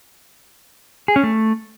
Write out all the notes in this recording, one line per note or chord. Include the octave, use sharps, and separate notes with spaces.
G#4
C#4
A3